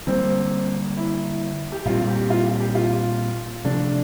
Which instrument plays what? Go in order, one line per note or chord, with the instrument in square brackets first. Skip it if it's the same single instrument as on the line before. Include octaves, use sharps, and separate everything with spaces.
[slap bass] D3 G3 A#3 [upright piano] C4
[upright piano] E4
G4
[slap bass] A#2 G3 C4 [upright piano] F4
[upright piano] G4
F4
G4
G4
F4
[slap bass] C3 F3 A3 [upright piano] D4